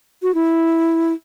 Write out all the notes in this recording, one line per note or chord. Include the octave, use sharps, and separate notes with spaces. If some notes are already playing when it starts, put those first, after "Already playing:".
F#4
E4